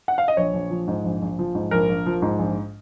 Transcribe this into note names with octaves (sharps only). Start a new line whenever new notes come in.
F#5
F5
D#5
A#1 C#5
A#1
F3
G#2
A#1
A#1
F3
G#2
A#1 A#4
A#1
F3
G#2
A#1